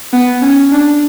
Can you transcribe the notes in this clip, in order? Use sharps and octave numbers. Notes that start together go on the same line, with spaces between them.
B3
C#4
D4